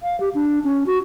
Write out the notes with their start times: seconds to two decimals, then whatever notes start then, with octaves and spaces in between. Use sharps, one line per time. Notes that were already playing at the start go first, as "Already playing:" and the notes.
0.03 F5
0.20 G4
0.35 D4
0.64 C#4
0.86 F#4